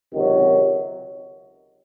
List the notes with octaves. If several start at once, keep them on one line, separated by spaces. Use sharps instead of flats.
C#2 C3 D#3 F#3